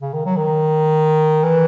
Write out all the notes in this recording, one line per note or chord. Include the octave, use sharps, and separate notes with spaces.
C#3
D#3
F#3
D#3
E3